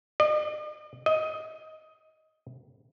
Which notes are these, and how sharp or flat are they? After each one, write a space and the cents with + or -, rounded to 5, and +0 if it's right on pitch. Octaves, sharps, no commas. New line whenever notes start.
D#5 -45
D#5 +15